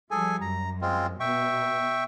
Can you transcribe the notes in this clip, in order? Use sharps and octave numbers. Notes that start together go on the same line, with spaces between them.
F3 G3 G#4 A4 G#5
F#2 A#5
G#3 C4 F4
B2 E5 G5 C#6